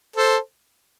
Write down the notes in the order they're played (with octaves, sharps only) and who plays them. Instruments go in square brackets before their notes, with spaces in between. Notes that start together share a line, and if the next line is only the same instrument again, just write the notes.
[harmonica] A4 C5